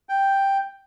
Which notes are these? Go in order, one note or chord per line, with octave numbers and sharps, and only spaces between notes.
G5